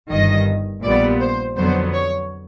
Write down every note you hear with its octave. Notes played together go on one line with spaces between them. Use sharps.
G1 G2 D#3 D#5
A#1 A#2 G3 B3 D5
C5
F2 D3 F#3 B3 C5
C#5